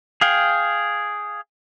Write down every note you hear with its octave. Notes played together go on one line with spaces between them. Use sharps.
G#4 F5 G5